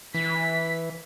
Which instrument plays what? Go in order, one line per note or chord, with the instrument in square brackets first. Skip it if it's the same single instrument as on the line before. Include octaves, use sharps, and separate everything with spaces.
[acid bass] E3 [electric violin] B6